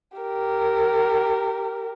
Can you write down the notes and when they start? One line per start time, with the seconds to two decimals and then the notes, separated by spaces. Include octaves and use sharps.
0.17 G4 A#4